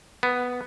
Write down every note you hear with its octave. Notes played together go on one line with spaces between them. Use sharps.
B3